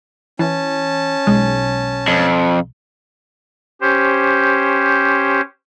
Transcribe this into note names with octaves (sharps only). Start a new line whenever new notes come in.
E3 C#4 A5
B1 G#3
F2
C#4 G4 C5